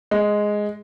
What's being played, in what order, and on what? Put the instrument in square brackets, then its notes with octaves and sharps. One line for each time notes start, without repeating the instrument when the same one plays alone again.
[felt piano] G#3